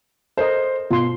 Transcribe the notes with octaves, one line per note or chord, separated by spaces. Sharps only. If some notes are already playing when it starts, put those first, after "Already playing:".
A4 A#4 C5 D#5
B2 F4 C6